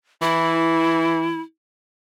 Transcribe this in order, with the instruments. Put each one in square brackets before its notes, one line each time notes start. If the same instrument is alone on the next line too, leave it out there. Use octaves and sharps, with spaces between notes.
[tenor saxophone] E3 [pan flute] E4